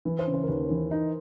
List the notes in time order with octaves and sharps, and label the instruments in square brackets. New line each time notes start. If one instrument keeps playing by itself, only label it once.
[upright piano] E3 [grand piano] B4
[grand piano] C5
[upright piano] C#3
[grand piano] C5
A#4
[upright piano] D#2 [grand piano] B4
[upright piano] E3
D#4